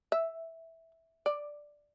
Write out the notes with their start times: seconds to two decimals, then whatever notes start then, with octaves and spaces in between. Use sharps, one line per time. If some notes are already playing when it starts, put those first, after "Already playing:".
0.12 E5
1.26 D5